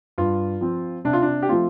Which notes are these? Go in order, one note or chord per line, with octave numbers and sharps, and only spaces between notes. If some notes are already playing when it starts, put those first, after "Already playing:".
G2 F4
F3 C4
C3 D4
F4
D4
G4
F3 A3 C4 F4